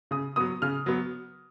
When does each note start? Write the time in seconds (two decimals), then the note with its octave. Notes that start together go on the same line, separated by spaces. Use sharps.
0.11 C#3 D#6
0.36 F#3 B3 D#6
0.62 C#3 F6
0.86 F#3 B3